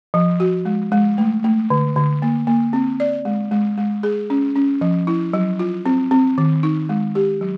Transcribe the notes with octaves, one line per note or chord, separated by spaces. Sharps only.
F3
F#4
G#3
G#3
A3
A3
D3
D3
A#3
A#3
C4
D5
G#3
G#3
G#3
G#4
C#4
C#4
F3
E4
F#3
F4
C4
C4
D#3
D#4
G#3
G4
F#3